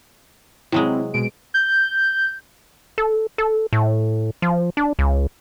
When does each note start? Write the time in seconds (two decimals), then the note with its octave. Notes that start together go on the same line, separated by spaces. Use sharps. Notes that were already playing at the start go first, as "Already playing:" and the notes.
0.72 C3 F#3 G#3 C4 E4
1.14 B2 G#3 D7
1.54 G6
2.98 A4
3.38 A4
3.73 A2
4.42 F3
4.77 D4
4.99 C#2